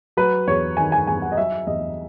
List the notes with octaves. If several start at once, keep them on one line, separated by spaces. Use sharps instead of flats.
F#3 B4
E2 C#5
D#3 G#5
G#5
E2 G#5
F#5
D#5
F#3 E5
E2 D#5